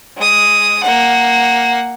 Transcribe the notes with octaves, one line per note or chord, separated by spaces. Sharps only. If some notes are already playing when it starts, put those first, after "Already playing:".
G#3 D#6
A#3 F#5